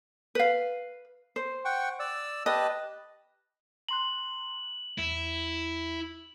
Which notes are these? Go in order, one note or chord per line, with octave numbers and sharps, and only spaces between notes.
B4 F5
C5
F#5 G5 C#6
D5 E6
G4 B4 D#5 A5
A#5 C6 F#6 F#7
E2 E4